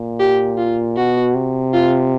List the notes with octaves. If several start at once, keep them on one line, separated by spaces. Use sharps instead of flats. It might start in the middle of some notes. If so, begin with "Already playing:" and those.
Already playing: A#2
G4
F4
B2 F#4
C3
F4